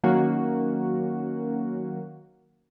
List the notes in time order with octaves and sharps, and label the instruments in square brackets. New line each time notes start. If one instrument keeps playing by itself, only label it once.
[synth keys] D#3 F#3 A#3 C#4 F#4